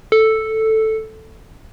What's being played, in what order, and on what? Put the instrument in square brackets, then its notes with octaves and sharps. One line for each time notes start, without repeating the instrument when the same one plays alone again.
[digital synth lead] A4